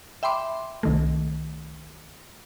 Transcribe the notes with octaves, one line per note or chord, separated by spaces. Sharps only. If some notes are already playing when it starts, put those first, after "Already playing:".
E5 G5 B5 C6 D6
C2 D#3 A3